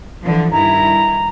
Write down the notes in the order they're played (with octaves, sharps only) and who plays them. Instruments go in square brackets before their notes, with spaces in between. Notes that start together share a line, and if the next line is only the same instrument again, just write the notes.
[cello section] D3 E3 F3
[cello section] G2 D#3 E4 [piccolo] A#5